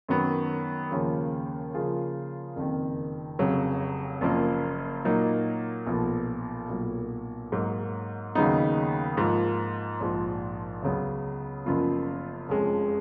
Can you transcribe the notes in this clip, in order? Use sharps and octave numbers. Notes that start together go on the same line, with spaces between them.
F#2 D#3 F#3 B3
D#2 C#3 F3 A#3 C#4
C#3 F3 A#3 F4 G#4
F#1 F2 D#3
F1 F2 C#3 F#3
F#1 F#2 F3 A#3
A#2 F#3 A#3 D#4
B1 A#2 F3 B3
B1 A#2 F#3
G#2 F#3 A#3
D#2 C#3 F#3 B3 D#4
G#2 F3 A#3 F4
A#1 G#2 F3
C#2 C#3 F#3 B3
F#1 F#2 F3 B3 F4
F1 F2 F3 G#3 C#4